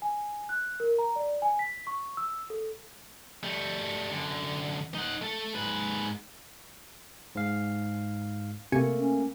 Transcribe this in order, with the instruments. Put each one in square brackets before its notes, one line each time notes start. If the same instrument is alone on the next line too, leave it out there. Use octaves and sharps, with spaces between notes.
[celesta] G#5
F#6
A#4
A#5
D5
G#5
B6
C#6
E6
A4
[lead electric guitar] G3 A3
F#2 D3
D#4 F#5
A3 A4
G#2 B4
[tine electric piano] G#2 F5
[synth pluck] C3 G#5 C#7 [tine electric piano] A3 A#3
[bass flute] C#4